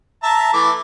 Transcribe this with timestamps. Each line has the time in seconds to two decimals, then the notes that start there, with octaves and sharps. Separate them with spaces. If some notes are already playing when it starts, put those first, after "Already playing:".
0.23 E5 A5 A#5
0.53 E3 A3 D6